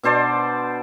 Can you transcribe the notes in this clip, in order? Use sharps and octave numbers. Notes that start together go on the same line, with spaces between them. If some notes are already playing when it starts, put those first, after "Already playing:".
B2 D4 C5 D5